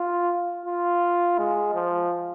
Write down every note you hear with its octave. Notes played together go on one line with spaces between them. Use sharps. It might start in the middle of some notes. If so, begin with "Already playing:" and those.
Already playing: F4
F4
G#3
F3